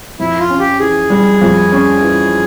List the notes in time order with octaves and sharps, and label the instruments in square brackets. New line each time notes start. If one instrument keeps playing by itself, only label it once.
[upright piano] F2 [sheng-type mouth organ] E4
[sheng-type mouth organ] F4
[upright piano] C#4
[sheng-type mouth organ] G4
[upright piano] E3 [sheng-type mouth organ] G#4
[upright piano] G3
F2
C#4
E3